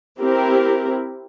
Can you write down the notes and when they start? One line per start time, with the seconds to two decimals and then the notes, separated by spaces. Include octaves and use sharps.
0.19 C4 E4 G4 A#4